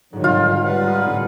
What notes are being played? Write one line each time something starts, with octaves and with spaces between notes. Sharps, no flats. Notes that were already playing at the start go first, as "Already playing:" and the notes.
G1 G#2 D#3 F#3
C3 C4 F4
G3 B4 F#5
A#5 C6 D#6
D2 A2 C4